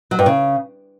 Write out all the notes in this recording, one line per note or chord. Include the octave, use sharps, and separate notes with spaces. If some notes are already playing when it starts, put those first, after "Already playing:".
F#3
G2
C#3